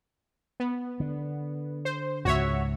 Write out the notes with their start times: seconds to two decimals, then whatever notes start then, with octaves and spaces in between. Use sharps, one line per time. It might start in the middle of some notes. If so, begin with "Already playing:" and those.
0.60 B3
1.00 D3
1.85 C5
2.25 C#2 G#2 F#4 C#5 E5